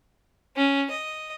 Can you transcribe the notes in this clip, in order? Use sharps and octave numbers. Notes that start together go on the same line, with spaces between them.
C#4
D#5